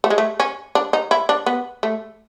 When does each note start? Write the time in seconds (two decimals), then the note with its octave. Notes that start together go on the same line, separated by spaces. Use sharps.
0.04 A3
0.10 G#3
0.18 A3
0.40 C#4
0.75 D4
0.93 D#4
1.11 E4
1.29 D4
1.46 B3
1.83 A3